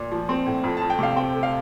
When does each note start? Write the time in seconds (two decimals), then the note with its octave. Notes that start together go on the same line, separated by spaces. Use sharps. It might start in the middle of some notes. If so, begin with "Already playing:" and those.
Already playing: A#2
0.11 F3
0.29 C4
0.46 A2
0.64 F2
0.77 A5
0.82 F2
0.90 G5
0.99 C3 F5
1.16 C4 G5
1.34 A3
1.43 F5